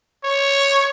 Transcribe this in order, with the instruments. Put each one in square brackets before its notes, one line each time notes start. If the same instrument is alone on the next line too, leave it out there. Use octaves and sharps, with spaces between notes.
[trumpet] C#5